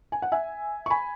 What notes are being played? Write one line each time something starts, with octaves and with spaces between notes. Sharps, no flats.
G#5
F#5
E5 G#5
C#6
G#5 B5